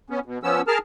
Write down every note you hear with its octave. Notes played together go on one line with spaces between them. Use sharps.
B3 C#4
B2
F3 B3 C#4 E6
G#4 A#4 A5 F6